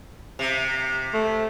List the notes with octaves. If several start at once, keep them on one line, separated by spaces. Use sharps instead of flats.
C3
A3